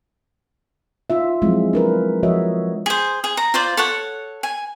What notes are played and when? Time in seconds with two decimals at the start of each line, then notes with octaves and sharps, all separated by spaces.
1.10 D#4 F4 E5
1.42 F3 F#3 G#3 C4 E4
1.73 D4 A#4 B4
2.23 F3 F#4 C#5 D#5 E5
2.86 G#4 C5
3.24 G#4
3.37 A#5
3.54 F4 C5 D5
3.77 A4 C#5 F#5
4.43 G#5